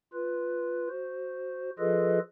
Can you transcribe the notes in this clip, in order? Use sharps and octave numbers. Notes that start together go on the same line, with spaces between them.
F4 B4
F#4 C5
F3 F4 G#4 A4 B4 D#5